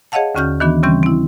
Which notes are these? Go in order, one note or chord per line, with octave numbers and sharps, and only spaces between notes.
G#4 C#5 D#5 F5 F#5 A5
D#2 D3 C#4 F#4 F6 G6
D#3 E3 B3 D4 F#4
C#3 E3 G3 C4 C#4 G6
C4 E4